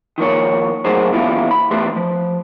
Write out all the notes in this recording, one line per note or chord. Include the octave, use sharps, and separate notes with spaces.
D#3 F3 A#3 C#5
F#3 A3 A#3 D#4 G#4 C5
A#2 E3 G3 B3 E4 F4
B5
E2 A3 G4 B4 C6
F3